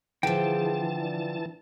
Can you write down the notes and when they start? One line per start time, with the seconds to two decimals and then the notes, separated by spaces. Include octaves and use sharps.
0.23 D3 E3 F3 G#4 G5 A5
1.00 D4